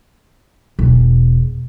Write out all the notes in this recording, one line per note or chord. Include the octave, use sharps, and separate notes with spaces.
E1